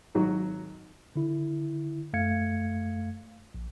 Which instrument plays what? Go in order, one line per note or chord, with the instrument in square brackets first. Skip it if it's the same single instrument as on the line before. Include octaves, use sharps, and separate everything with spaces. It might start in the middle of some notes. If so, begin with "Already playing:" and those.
[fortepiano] G#1 F#3 D#4 F#4
[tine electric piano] D3 E4
F#2 A3 F5 G#6 C#7
A#1